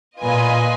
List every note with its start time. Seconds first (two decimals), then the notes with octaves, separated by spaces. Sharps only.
0.22 A#2 F4 B4 D#5 G#5